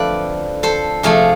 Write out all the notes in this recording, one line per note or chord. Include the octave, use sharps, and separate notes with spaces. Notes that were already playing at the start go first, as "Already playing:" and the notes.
Already playing: D3 F3 A3 C4 B4 D5 E5
A4 C5
C3 F3 A3 G#4